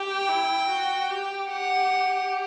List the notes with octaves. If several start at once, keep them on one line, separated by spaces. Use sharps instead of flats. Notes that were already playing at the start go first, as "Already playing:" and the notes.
Already playing: G4 G5
E4
F#4
G4
G4 F#5